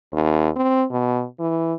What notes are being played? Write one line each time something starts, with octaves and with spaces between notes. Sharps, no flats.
D#2
C4
B2
E3